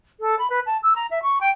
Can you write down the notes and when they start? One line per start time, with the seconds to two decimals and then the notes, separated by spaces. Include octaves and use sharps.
0.20 A4
0.39 B5
0.50 B4
0.66 A5
0.83 E6
0.96 A#5
1.11 E5
1.23 C#6
1.41 G5